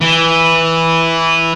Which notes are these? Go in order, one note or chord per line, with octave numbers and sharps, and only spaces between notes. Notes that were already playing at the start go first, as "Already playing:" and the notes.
E3